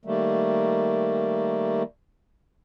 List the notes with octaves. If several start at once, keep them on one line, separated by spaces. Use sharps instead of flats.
D#3 G3 A3 A#3